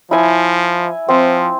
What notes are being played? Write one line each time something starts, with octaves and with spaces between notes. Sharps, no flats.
F3 E4 G#5
F3 C4